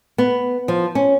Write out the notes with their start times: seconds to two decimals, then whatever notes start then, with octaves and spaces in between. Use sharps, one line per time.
0.18 B3
0.68 F3
0.95 C#4